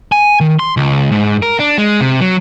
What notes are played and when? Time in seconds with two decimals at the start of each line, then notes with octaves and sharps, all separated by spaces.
0.12 G#5
0.40 D#3
0.59 C6
0.77 C#2
1.12 G#2
1.42 A#4
1.59 D4
1.78 G#3
2.00 C3
2.21 F#3